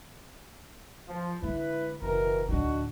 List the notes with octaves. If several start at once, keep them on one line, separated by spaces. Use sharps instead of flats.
F3
D3 G#3 E4 B4
F#1 B2 E3 A#4
D2 A2 D4 D#4 F#4